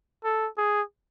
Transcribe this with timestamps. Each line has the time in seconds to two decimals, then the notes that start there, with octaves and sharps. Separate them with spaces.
0.24 A4
0.58 G#4